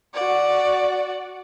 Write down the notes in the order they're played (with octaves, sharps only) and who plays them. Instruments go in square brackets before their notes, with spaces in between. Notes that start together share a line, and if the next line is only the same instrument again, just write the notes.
[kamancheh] F#4 D5